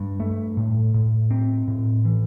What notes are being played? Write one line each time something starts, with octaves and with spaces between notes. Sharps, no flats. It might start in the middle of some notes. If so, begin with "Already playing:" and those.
Already playing: G2
A3
A2
A2
C4
A2
E3